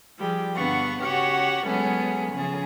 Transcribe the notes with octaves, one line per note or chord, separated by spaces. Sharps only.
F3 G3 G4 G#4
G2 D3 B3 F5 F#5 C#6
C#3 F#4 G4 C#5 F#5 C#6
F#3 G#3 A3 B3 C#4 G#4
C#3 F3 G#4